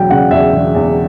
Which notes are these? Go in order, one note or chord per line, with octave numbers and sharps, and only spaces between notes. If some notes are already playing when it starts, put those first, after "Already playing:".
Already playing: E1 F#3 G5
C#3 F#5
E2 E5
E1
E2